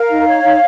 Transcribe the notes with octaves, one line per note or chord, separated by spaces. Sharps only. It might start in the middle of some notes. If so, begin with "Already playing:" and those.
Already playing: A#4 F5
D#4
C#5
D#4